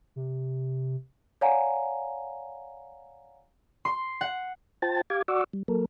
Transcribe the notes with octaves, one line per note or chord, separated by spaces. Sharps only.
C3
C#5 D5 F5 F#5 G#5 A#5
C6
F#5
F4 C5 G5 A5 A6
G4 F5 D6 G#6
F#4 D5 F#5 C#6 D6 E6
G3
F#3 A#3 A4 A#4